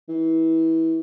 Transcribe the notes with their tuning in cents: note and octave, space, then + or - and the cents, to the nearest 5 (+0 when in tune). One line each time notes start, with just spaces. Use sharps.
E3 -25